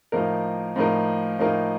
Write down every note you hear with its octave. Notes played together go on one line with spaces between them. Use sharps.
A2 F3 A#3 D#4 A#4
A2 F3 A#3 D#4 A#4
A2 F3 A#3 D#4 A#4